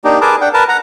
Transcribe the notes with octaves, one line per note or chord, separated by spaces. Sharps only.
A#3 D4 D#4 G4
G#4 A#4 B4 A5 D6
D4 F#5 G5
A#4 B4 A5
F#5 A#5